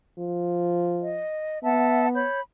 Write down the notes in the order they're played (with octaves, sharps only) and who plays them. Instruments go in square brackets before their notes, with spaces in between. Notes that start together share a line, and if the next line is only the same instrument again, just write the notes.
[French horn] F3
[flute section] D#5
[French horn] B3 [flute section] E5 F#5 A5
[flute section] C#5 B5 G6